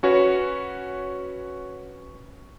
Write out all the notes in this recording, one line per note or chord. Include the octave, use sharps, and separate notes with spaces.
C#4 F#4 B4 C#5